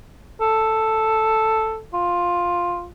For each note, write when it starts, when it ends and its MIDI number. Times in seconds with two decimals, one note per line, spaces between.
0.41 1.81 69
1.94 2.87 65